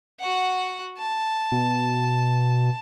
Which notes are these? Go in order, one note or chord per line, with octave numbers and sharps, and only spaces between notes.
F#4 F#5
A5
B2